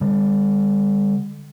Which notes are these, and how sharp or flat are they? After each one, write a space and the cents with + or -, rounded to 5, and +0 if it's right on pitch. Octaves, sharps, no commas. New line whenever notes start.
D3 +0 G3 +35